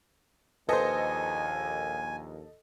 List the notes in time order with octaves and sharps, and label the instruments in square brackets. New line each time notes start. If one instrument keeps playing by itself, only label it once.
[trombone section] A#1 D#2 [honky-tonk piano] A4 D#5 [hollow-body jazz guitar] B4 C5 [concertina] G#5